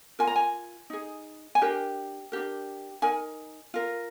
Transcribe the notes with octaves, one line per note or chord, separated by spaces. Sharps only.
F4 A#4 G#5
A#5
G#5
D#4 G#4
G#5
D4 G4 A#4 G5
D4 G4 A#4
D#4 A#4 G#5
F4 A#4